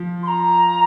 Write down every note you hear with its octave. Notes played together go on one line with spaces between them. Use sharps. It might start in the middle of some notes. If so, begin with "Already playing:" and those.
Already playing: F3
C6
A#5